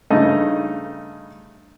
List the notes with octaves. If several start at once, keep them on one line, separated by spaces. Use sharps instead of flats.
G2 C#3 A3 D#4 D#5